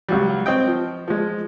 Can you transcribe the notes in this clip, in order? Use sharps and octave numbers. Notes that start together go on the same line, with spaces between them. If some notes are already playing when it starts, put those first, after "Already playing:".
C#2 F#3 G3
C4 C#5 D#5 G5
F3
F3 G#3